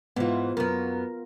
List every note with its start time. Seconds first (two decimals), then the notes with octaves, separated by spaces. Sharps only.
0.16 G#2 E3 B3 F4
0.57 F#2 B3 A#4